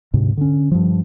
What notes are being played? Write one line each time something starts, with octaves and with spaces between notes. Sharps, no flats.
D2 G#2 C3
D3 C#4
G2 F3